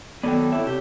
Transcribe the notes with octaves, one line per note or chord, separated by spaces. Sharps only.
D#3 F#3 B3 A4 D5 G5
C4 E4 A4 C#5 E5
C3 G4